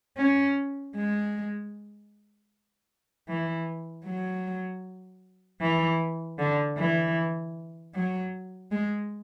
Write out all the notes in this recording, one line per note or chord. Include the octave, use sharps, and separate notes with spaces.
C#4
G#3
E3
F#3
E3
D3
E3
F#3
G#3